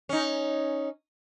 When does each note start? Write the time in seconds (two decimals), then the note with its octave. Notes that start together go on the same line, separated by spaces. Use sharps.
0.09 C#4 D#4